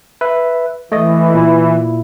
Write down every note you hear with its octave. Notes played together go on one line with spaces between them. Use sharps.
B4 E5
E3 A3 D#5
A#2 E4